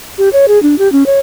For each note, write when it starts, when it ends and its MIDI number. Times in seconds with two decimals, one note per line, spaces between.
0.18 0.29 67
0.33 0.46 73
0.48 0.61 68
0.63 0.77 62
0.78 0.91 67
0.92 1.06 61
1.06 1.19 73